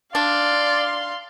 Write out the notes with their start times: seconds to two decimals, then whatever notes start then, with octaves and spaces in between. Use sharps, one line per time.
0.15 D4 D5 F5 C6